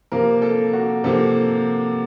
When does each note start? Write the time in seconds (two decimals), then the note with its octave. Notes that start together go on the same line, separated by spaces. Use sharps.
0.12 C3 F3 A#3 A#4
0.42 A4
0.73 F#4
1.04 C3 F3 A#3 A4